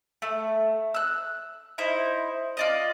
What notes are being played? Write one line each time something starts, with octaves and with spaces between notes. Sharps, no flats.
A3
E6 F#6
D#4 E4 C5
F4 D5 D#5